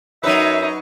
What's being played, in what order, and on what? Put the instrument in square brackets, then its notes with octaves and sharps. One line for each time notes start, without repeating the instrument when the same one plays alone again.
[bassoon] F#2 [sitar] F#3 B4 [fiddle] D#4 [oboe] E5